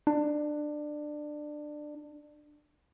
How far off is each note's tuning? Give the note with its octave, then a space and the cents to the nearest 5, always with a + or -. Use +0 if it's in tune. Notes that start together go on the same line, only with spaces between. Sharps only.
D4 +20